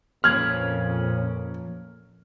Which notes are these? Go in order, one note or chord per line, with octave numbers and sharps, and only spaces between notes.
F2 A#2 F3 A#3 C#4 B4 F6 G#6